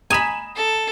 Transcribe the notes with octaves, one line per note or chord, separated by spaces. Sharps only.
G#5 A#5 B5 D#6 E7
A4